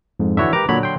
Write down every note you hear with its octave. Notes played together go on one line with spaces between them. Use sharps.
F2 G#2
D3 E3 E4 F#4 C#5 E5
G4 A#4 B4 A#5 D6
A#2 D3 F#3 C#5 B5
G5 C6